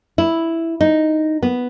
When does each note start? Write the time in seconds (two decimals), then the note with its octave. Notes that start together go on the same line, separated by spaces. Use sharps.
0.18 E4
0.81 D#4
1.42 B3